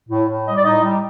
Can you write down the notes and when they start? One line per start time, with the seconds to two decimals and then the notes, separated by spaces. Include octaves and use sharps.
0.09 A2
0.28 A2
0.47 G3 D#5
0.56 D5
0.65 A2 D#4 D#5
0.83 G3